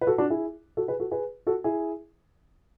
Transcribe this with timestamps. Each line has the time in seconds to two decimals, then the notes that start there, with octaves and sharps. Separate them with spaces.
0.01 B4
0.07 F#4 A4
0.18 D4 F#4
0.30 E4 G#4
0.77 F#4 A4
0.88 G#4 B4
1.00 F#4 A4
1.11 G#4 B4
1.47 F#4 A4
1.64 E4 G#4